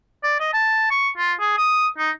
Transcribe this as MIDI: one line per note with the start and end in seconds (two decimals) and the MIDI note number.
0.24 0.36 74
0.40 0.52 75
0.53 0.87 81
0.91 1.10 85
1.18 1.33 65
1.40 1.57 68
1.58 1.88 87
1.98 2.11 63